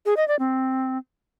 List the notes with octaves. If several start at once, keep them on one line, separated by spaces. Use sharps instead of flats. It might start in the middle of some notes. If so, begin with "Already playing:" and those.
G#4
D#5
D5
C4